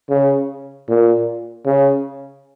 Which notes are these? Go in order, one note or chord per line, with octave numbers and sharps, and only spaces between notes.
C#3
A#2
C#3